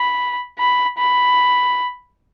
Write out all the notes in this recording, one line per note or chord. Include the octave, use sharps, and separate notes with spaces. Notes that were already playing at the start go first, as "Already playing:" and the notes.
Already playing: B5
B5
B5